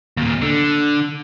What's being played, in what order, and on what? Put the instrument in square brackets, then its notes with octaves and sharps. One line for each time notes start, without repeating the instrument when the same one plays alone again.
[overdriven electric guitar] D#2 A#2
D3